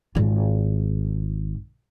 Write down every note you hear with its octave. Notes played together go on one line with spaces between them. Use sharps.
G#1 F4